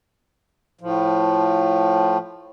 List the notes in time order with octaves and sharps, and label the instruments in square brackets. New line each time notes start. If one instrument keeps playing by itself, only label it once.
[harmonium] A2 F3